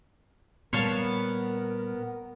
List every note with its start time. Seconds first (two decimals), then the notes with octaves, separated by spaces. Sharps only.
0.73 A#2 G3 B3 A#4 C#5 F5 A5